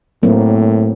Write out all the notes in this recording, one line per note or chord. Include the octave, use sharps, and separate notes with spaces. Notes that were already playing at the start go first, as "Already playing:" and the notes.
A2 F#3 A#3 C4